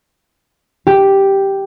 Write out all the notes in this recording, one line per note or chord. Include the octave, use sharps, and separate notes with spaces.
G4